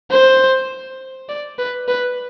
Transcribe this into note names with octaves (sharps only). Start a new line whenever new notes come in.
C5
D5
B4
B4